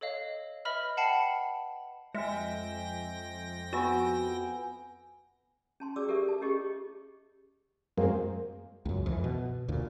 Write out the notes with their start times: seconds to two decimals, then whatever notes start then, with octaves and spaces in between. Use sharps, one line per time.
0.01 A4 C#5 D#5 F5
0.65 B4 D#5 E5 B5 F6
0.97 F#5 G5 A5 B5 C7 C#7
2.14 F2 G#3 E5 G5 G#5 A#6
3.73 B3 F#4 G#5 E6
5.80 C#4 A5 C6
5.96 C#4 F#4 G#4 D5 D6 E6
6.08 G4 A4 A#4 D5 E5
6.29 A5
6.41 C#4 F4 G4 G#4 D#5 C#6
7.98 F#2 G#3 A#3 C4
8.85 C#2 F#2
9.06 F2 E3
9.24 B2
9.68 D2 A#2